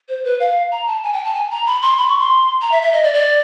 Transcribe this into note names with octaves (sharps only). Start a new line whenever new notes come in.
C5
B4
F5
A#5
A5
G#5
G5
A5
G#5
A#5
B5
C6
B5
C#6
C6
A#5
E5
E5
D#5
D5
D5